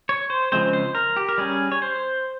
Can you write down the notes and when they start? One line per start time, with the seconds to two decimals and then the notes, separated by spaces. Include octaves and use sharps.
0.09 C#5
0.30 C5
0.52 C#3 F3 G#3 C4 C5
0.73 C5
0.95 A#4
1.17 G4
1.29 A#4
1.38 G3 C#4 G#4
1.72 C#5
1.82 C5